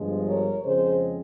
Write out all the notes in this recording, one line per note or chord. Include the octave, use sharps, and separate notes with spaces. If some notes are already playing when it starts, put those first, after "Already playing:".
Already playing: G1 G2 F3 G#3
A#4 C#5
F2 C#3 G#3 C4 G#4 C5